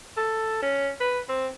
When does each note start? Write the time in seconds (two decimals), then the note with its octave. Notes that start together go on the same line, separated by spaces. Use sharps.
0.17 A4
0.62 C#4
1.01 B4
1.29 C4